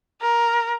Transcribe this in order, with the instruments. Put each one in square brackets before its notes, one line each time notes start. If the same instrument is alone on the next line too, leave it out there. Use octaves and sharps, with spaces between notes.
[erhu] A#4